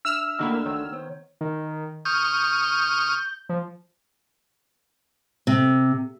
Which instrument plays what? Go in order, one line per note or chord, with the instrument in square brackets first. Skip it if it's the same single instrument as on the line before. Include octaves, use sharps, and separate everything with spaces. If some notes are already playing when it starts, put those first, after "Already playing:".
[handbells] D4 E5 [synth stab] E6 F6
[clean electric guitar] D2 D3 [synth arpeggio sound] D#3 A#3 E4
[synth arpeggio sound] D#3 [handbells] C#5
[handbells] B3 C5 C#5
[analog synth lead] D#3
[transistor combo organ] C#6 D#6 F6 [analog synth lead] G6
[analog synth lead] F3
[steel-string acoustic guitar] C3